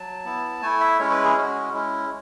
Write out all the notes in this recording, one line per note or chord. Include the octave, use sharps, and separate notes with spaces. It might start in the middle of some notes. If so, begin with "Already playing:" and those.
Already playing: F#3 A5
B3 E4
A3 E4 G#5
E5
G#3 C#4 E4 C#5
B4
G#4
G#3 C#4 F#4
G#3 C#4 E4